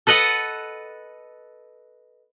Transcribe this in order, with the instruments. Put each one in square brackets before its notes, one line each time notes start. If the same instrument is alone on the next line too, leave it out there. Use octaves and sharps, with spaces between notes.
[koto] A4 B4 D#5 F#5 A5